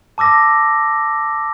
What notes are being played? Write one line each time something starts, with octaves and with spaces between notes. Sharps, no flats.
A5 D6 E6 A#6